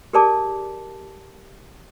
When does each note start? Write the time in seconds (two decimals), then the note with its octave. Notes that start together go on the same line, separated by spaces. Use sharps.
0.13 G4 G#4 A#4 D5 A5 D6